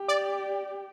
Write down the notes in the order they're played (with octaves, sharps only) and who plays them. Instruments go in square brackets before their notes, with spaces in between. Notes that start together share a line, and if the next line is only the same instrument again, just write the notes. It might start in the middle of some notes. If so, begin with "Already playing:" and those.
Already playing: [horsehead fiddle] G4
[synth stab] D5